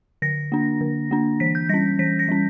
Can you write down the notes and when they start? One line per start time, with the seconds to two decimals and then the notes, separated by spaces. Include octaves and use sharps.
0.22 D3 A#6
0.52 A#3 D4
0.81 D3
1.11 A#3 D4
1.40 E3 B6
1.55 G6
1.69 G3 C#4 A#6
1.99 E3 B6
2.19 A#6
2.28 G3 C#4